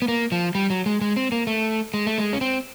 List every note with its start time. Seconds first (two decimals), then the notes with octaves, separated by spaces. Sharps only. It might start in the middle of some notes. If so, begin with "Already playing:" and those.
0.02 B3
0.08 A#3
0.32 F3
0.55 G3
0.70 F#3
0.86 G#3
1.01 G#3
1.16 C4
1.32 A#3
1.47 A3
1.94 G#3
2.07 A3
2.18 G#3
2.33 C#4
2.41 C4